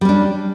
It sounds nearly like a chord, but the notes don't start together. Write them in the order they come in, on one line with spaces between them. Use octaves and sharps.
G3 C#4 D4